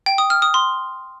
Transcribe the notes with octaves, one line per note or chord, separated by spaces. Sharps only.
G5
D#6
F6
D#6
C6